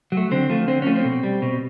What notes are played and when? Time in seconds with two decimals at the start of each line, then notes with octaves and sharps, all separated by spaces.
0.12 F#3
0.17 A3
0.31 D3 C4
0.50 F3 A3
0.68 D3 C4
0.82 F3 A3 C#4
0.95 C4
1.05 B2
1.23 G3
1.42 B2